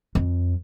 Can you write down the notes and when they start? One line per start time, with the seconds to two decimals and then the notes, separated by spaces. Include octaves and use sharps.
0.15 F2